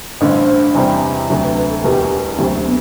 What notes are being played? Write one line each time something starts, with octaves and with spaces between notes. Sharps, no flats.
A1 G2 D3 C5
E2 C3 G3 C4
D2 C3 F#3
B4
B4
A4
E1 E2 B2 G4
D2 C3 F#3 C4 F#4 G4
B3